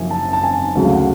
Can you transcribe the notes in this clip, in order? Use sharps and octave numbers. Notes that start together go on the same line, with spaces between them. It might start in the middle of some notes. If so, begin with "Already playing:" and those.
Already playing: F#1 F#2 F3 G#5
A5
A5
G#5
D2 C#3 F#3 F#5
F5
F#5